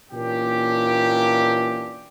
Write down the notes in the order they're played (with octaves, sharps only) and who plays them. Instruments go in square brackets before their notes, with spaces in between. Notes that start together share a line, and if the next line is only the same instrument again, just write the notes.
[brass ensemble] A#2 E3 A#3 C#4 D4 G4